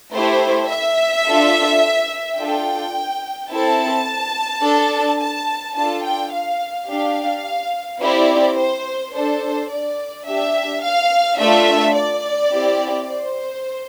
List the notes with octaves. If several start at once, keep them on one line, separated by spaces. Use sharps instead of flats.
A3 E4 G4 C5
E5
D4 F4 A4
D4 F4 A4 G5
C4 E4 A4 A5
D4 A4
A5
D4 F4 A4 A5
G5
F5
D4 G4 F5
C4 E4 G4 D5
C5
D4 A4 C5
D5
D4 G4 E5
F5
A3 D4 F4 A4 E5
D5
C4 E4 G4
C5